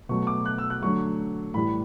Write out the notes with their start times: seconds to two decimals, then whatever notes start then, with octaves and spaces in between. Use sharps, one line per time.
0.09 B2 F#3 A3 C#6
0.27 D6
0.45 F#6
0.58 E6
0.70 F#6
0.82 D3 F#3 A3 C#6
1.54 A2 E3 G3 B5